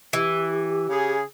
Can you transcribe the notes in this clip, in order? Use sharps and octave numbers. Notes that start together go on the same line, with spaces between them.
E3 G4
C#3 G#4